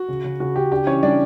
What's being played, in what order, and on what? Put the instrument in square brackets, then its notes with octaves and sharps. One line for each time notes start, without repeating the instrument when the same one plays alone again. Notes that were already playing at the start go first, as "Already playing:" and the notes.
Already playing: [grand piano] F#4
C#3
C#3
C#3 F#4
C#3 G4
D4 G4
E3 C#4 C#5
G3 D4 D5